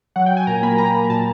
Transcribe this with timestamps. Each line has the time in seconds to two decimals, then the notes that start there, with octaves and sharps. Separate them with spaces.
0.16 F#3 F#5
0.26 G5
0.31 F#3
0.37 G#5
0.47 A#2 A#5
0.63 A#3 B5
0.78 A#3 A#5
0.94 A#3
1.10 A#2 A5